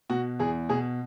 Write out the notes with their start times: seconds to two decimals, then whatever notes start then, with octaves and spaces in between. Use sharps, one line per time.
0.10 B2 F#4
0.39 E2 G#4
0.69 B2 G#4